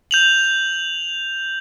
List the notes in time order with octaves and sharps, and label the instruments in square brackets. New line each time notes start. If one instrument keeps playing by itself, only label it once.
[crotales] G6 F7 F#7